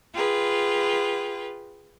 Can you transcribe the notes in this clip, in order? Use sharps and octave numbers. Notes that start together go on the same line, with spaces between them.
F4 G#4 B4 G5